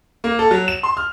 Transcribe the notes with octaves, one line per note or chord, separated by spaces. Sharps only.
A#3
A4
F#3
E7
C6
F6